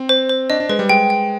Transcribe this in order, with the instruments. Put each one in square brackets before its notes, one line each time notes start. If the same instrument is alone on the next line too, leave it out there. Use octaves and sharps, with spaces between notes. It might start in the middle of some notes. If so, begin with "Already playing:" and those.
Already playing: [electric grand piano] C4
[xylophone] C5
C5
[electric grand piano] D4 [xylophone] D#5
[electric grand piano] D4
[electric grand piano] G#3 [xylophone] B4
[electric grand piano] G3
[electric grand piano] G#3 [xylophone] G5
[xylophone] G5